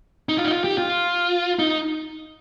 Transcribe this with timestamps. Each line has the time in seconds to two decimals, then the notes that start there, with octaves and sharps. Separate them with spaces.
0.29 D#4
0.37 F4
0.45 D#4
0.51 F4
0.64 G4
0.78 F4
1.59 D#4